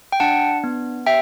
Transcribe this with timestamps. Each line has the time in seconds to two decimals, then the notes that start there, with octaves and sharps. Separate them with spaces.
0.12 G5
0.20 D4 F#5 A5
0.64 B3
1.06 G4 E5 G5